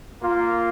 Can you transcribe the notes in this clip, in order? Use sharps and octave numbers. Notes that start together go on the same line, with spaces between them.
A#3 F4